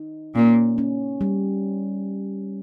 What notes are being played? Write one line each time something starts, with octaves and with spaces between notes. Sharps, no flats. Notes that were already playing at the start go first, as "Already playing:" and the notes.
Already playing: D#4
A#2 C#4
C#4
G3